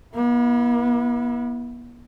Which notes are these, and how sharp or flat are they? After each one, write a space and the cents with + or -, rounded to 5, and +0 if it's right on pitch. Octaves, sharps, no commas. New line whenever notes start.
B3 -45 E4 +0